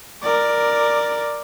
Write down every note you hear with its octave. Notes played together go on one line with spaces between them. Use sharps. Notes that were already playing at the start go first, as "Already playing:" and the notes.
A#4 D5